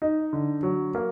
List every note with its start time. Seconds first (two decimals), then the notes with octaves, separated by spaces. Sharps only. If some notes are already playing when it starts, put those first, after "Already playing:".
0.02 D#4
0.33 D3
0.63 F#3
0.95 A#3